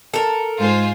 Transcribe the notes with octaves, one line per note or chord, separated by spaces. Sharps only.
A4 A#4
G#2 G#3 F4 C5 G#5